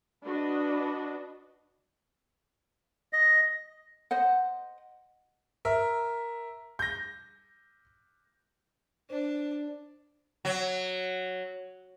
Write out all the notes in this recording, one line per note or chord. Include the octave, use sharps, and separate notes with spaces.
D4 F#4 B4 D#5
D#5
C5 D#5 F#5
A#4 E5
G6 A#6
D4 C5
F#3